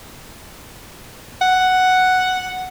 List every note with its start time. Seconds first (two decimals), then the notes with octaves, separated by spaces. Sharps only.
1.42 F#5